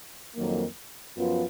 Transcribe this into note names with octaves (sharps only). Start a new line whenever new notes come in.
F2 D#3 F#3 A#3
F#2 F3 B3 F4